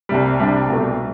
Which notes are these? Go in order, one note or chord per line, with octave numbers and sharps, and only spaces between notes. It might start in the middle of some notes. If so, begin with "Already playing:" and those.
C2 C3 G3
C2 C3 G3 D4
C2 B2 A3